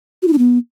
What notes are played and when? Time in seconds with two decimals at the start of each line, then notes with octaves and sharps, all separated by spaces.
0.22 F#4
0.28 E4
0.33 D4
0.38 B3